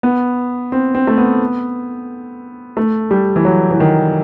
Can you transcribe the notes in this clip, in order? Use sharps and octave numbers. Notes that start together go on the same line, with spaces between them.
B3
C4
C4
A3
B3
A3
G3
E3
F#3
E3
D#3